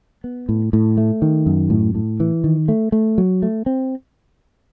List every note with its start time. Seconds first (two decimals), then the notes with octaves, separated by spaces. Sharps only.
0.24 B3
0.49 A2
0.73 A2
0.97 A3
1.22 D#3
1.46 F#2
1.70 A2
1.95 A2
2.20 E3
2.44 D#3
2.68 A3
2.92 A3
3.18 F#3
3.42 A3
3.66 C4